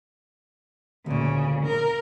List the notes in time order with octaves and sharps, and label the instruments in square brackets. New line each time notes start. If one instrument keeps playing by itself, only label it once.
[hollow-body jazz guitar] D2 A#2 [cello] C#3
[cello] A#4